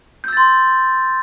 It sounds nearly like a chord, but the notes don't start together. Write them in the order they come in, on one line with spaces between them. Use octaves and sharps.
G6 E6 A6 C6